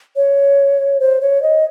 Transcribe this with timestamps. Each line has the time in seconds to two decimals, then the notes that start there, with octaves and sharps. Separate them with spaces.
0.16 C#5
1.00 C5
1.21 C#5
1.42 D#5